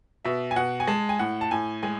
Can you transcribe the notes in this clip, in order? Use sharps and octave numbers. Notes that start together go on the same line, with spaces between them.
B2 E5
G#5
B2 F#5
G#5
G#3 A5
G#5
A2 F#5
A5
A2 G#5
G#3 G#5